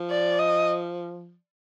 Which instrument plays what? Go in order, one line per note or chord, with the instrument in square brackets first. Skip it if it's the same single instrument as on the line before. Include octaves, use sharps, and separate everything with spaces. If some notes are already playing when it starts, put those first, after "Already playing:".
Already playing: [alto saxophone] F3
[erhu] D5
D#5